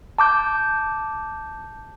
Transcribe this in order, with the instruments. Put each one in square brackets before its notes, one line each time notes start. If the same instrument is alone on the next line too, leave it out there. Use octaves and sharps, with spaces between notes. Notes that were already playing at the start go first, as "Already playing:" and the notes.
[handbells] A5 D6 G6